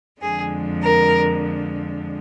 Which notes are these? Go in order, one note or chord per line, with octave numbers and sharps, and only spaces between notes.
F2 D3 F3 G#3 G#4
A#4